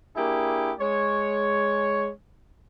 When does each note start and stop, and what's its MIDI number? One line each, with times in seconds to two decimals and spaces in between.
0.17 0.73 58
0.17 0.73 62
0.17 0.73 64
0.17 0.73 67
0.17 0.73 68
0.80 2.10 56
0.80 2.10 73